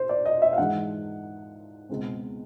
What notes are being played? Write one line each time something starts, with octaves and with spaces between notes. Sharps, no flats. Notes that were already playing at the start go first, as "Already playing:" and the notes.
Already playing: C5
D5
D#5
E5
F5
G#2 E3 G#3 F#5
C#2 B2 G#3 C4